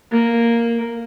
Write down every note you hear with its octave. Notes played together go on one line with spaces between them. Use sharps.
A#3